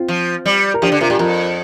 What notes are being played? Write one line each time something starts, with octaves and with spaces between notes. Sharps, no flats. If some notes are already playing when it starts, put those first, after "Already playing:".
Already playing: C4 F4
F3
G3
A#4
F3 D4 G4
D3
C3 F4 A#4
A#2 G4
F2 F4 A#4